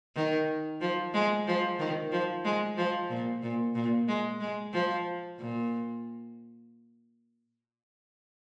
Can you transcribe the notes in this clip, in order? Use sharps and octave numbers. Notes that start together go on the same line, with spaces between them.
D#3
F3
G#3
F3
D#3
F3
G#3
F3
A#2
A#2
A#2
G#3
G#3
F3
A#2